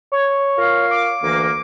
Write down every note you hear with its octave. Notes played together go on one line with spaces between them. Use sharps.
C#5
F4 A#4 F5
D6
D2 E3 A#3 D6